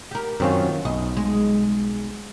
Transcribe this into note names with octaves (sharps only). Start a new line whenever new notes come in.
G4 A#4
F#2 D#3 F#3 C4 C#4 F4
B1 D#5
G#3